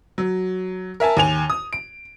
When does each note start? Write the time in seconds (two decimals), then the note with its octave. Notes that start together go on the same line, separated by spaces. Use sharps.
0.18 F#3
1.00 A#4 E5 G#5 A5
1.17 D#2 G#5 F7
1.50 D#6
1.73 D7